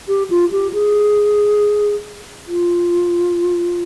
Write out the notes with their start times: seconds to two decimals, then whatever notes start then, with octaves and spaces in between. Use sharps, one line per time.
0.08 G4
0.30 F4
0.53 G4
0.73 G#4
2.47 F4